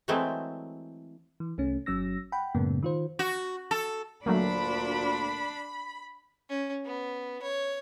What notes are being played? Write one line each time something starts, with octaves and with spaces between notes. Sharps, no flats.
E3 F#3 G#3 A3 C4 E4
E3
C2 A3 C#4
G1 F#3 C#4 E6 A#6
F#5 G5 B5
F#2 A2 C#3 G#3 A#3 B3
D#3 F4 C5
F#4
A4
D2 A#2 F#3 A3 A#3 D4 B5
C#4
B3
C#5